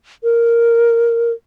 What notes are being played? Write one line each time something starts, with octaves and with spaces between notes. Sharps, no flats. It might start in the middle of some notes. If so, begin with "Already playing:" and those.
A#4